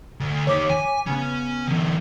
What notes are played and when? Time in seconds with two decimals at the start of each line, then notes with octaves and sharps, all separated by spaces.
0.20 D2
0.47 D#3 G4 C#5 D6 B6
0.70 G#5
1.07 C#3 B3 C#4
1.68 D3 E3